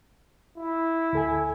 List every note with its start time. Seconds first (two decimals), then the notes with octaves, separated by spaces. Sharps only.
0.58 E4
1.13 D2 A4 G#5